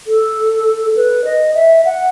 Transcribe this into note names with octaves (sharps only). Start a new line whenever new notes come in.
A4
B4
D#5
E5
F#5